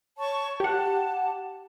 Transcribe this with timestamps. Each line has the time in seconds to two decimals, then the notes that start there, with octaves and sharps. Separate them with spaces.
0.18 C#5 A5 C#6
0.60 G4 F#5 A5